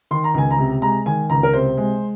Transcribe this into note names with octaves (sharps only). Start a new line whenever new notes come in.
D#3 C6
A#5
C#2 G#5
A#5
C3
G#3 A#5
D#3 G#5
C#2 A#5
A#4
C3 C5
G#3